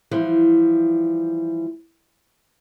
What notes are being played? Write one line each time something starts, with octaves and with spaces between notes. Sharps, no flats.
E3 F3 G3